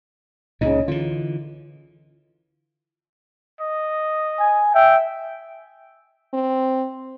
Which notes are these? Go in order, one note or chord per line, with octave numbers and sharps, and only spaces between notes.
C#2 A#2 C#3 D#4
D3 E3 F4
D#5
G#5
E5 G5
C4